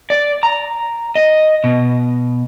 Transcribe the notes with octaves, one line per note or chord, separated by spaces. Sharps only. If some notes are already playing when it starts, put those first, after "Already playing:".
D5
A#5
D#5
B2